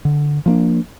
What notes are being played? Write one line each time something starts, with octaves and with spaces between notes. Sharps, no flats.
D3
F3 A#3 D4